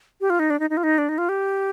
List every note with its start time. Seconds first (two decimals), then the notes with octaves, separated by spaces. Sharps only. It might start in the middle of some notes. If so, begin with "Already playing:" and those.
0.21 G4
0.30 F4
0.39 D#4
0.50 D4
0.60 D#4
0.70 D#4
0.77 F4
0.83 D#4
0.98 D4
1.09 D#4
1.18 F4
1.29 G4